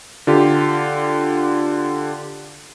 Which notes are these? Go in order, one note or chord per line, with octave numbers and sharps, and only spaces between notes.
D3 F4 G4